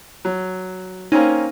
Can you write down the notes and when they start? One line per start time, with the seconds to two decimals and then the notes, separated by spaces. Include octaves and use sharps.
0.25 F#3
1.12 A#3 C4 C#4 D#4